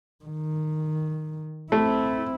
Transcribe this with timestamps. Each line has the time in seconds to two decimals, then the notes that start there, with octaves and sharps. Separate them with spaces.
0.25 D#3
1.72 A3 C4 E4